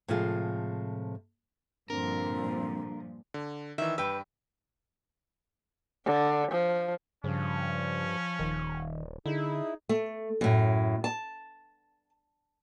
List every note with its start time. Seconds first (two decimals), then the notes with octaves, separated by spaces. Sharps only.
0.08 A2 C3 F3 G#3 F4 G#4
1.90 G2 A#2 D3 F3 C4 A#4
3.34 D3
3.78 D#3 E3 E5
3.98 G2 B4 G5 E6
6.05 D3
6.51 F3
7.24 G2 C#3 F3 C#4
8.39 D#1 D#3
9.26 D3 D#4 E4 G#4
9.89 A3
10.41 F#2 A2
11.04 A5